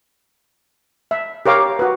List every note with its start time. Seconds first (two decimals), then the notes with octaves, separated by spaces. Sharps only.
1.11 E5
1.46 G4 A#4 C#5 F5 D6
1.79 F#4 B4